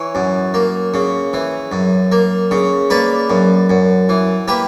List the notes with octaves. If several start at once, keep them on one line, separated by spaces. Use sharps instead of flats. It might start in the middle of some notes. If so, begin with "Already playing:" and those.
Already playing: E3 C#5
F#2
A#3
C#3
E3
F#2
A#3
C#3
A#3 B4 D5
F#2
F#2
E3
A#3 G4 B4